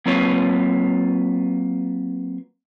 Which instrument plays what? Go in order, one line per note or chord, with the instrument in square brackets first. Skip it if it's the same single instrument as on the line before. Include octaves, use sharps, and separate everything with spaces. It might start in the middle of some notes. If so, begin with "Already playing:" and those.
[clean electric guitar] F#3 A#3 C4 F4 B4 C#5